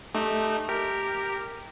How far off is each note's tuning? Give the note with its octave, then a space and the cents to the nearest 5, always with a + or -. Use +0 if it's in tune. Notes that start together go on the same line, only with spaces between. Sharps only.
A3 -15 D#4 -20 G4 +0
G4 +0 A#4 -10